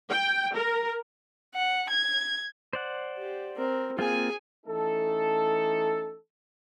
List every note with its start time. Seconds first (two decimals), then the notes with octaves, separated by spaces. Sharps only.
0.10 G5
0.54 A#4
1.55 F#5
1.90 G#6
2.73 C5 D5 F#5
3.19 G4
3.57 C4 A#4
3.99 A#3 C4 F4 G#4 G#5
4.67 E3 A3 C#4 D#4 A4